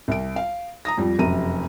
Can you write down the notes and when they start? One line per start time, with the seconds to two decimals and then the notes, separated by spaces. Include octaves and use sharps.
0.08 C2 D7
0.36 F5
0.85 A#5 D#6 A#6
0.98 F2 F3 G3
1.19 F1 F#2 C3 A#5 D#7